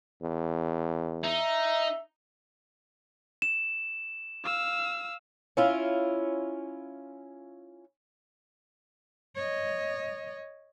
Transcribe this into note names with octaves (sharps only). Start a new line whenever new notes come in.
E2
D#4 E5
E7
F5 E6
C#4 E4 F4
C#5 D#5